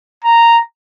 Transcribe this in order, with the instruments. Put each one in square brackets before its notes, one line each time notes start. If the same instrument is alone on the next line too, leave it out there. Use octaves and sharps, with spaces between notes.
[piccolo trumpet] A#5